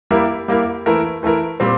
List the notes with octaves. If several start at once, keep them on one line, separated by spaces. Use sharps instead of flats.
G3 A#3 E4 A#4
G3 A#3 E4 A#4
E3 A3 E4 A#4
E3 A3 E4 A#4
A#2 G3 C4